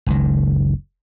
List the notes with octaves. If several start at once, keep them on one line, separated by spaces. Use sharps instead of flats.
F#1 C#2 D#3